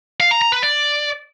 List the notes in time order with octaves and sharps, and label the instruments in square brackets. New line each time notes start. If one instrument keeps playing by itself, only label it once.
[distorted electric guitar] F5
A#5
A#5
B4
D5